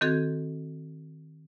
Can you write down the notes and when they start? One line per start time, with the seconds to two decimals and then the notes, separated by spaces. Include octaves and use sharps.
0.01 D#3 C4 F#4 A4 G6 G#6